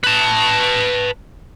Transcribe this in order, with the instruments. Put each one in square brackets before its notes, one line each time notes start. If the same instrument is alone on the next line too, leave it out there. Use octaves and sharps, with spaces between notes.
[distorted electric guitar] B4 A5